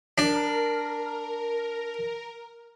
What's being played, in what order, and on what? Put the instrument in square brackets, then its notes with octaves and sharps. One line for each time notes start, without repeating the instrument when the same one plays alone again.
[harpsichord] D4 [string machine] A#4